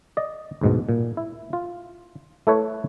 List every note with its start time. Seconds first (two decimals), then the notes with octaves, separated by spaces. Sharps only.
0.17 D5 D#5
0.61 D2 G#2 B2
0.89 A#2
1.17 E4
1.53 F4
2.47 A3 E4 A4 B4 C#5 E5